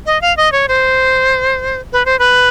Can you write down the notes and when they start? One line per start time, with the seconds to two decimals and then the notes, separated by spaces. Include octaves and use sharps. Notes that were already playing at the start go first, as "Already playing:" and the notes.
0.06 D#5
0.22 F5
0.37 D#5
0.52 C#5
0.68 C5
1.93 B4
2.05 C5
2.19 B4